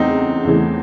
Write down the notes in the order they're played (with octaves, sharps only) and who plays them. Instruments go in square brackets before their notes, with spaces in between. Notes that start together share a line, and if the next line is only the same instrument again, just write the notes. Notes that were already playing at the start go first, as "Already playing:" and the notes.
Already playing: [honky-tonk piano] E2 C#3 E3 A3 [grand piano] C4 D#4
[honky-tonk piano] E2 C#3 E3 A3